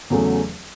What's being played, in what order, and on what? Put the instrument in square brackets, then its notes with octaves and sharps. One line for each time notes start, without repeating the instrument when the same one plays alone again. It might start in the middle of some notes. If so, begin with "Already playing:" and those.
[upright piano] E2 C#3 F#3 A3